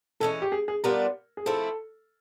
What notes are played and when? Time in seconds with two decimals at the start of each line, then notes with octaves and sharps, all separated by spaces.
0.20 E3 G#3 C#4 A4
0.42 G4
0.52 G#4
0.68 G#4
0.84 G3 B3 D4 F4 A#4
1.37 G#4
1.46 F3 A3 C4 E4 A4